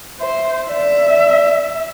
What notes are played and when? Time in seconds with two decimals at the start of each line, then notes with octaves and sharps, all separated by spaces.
0.20 C5 E5
0.69 D5 E5